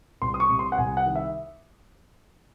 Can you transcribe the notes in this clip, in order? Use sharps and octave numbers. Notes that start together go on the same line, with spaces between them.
C2 C6
D#6
C#6
C3
C6
F#5
C2 G#5
F#5
D#3
E5